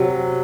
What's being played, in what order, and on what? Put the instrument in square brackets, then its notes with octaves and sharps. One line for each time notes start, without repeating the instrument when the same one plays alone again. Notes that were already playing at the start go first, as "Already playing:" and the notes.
Already playing: [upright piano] C3 F#3